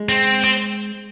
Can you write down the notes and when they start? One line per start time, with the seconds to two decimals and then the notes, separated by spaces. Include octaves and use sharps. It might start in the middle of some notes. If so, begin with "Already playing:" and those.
Already playing: G#3
0.09 C4
0.44 C4